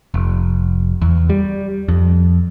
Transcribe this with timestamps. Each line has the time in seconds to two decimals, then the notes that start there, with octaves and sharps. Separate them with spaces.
0.14 F1
1.02 E2
1.30 G3
1.88 F2